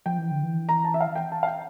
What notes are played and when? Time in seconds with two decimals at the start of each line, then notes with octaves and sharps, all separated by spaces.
0.06 F3 G5
0.18 E3
0.31 D3
0.43 E3
0.69 A#5
0.84 A5
0.94 E5
1.01 F5
1.16 G5
1.32 A5
1.43 F5
1.48 G5